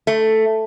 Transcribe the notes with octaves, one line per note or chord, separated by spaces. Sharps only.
A3